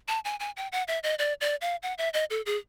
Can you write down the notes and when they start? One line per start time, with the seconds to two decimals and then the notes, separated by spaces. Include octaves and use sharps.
0.08 A5
0.25 G#5
0.40 G#5
0.57 G5
0.72 F#5
0.88 E5
1.03 D#5
1.19 D5
1.41 D5
1.61 F5
1.83 F#5
1.98 E5
2.14 D#5
2.30 A4
2.46 G#4